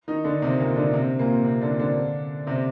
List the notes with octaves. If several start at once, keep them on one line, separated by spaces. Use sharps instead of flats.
D#3 D#4
D3 D4
C3 C4
A#2 A#3
D3 D4
C3 C4
A#2 A#3
C3 C4
D3 D4
D3 D4
C3 C4